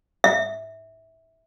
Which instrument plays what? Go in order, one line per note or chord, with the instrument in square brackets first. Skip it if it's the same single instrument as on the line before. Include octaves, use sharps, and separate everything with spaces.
[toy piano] E5